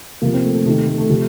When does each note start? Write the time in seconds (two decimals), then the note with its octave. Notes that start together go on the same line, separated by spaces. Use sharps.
0.22 C3 F3 A#3
0.34 C4
0.44 A3
0.55 A3
0.65 C3 A3
0.69 D#3
0.77 A3
0.87 A3
0.98 A3
1.09 C3 F3